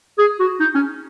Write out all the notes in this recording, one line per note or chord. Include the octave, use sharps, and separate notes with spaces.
G#4
F#4
D#4
C#4